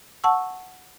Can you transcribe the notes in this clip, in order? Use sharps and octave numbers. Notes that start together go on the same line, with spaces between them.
F#5 A5 C#6 E6